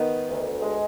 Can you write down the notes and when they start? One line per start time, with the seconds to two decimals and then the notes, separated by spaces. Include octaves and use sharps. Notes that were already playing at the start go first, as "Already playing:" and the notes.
Already playing: D#3 B3
0.29 D2
0.62 G#3